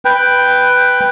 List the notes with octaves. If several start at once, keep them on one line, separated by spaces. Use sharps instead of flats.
B4 G5